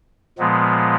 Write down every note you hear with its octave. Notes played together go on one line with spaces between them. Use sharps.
A#2 F3 G#3 B3